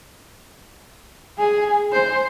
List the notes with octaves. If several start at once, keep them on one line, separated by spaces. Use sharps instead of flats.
G#4
C5